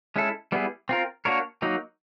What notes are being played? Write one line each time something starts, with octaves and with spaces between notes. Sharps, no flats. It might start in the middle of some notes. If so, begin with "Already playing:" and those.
G#3 C#4 E4 A4
G3 B3 E4 G#4
C4 F4 A#4
A#3 D4 F#4 A#4 C#5
F#3 A#3 D#4